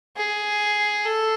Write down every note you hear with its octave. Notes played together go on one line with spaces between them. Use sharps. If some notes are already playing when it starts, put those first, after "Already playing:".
G#4
A4